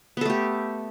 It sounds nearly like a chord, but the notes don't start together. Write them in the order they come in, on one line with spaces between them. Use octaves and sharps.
B3 A4 A3 G4